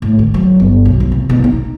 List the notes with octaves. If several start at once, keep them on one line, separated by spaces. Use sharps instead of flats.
A2
D3
F#3
G1
B1
E2
C3
B2
D#4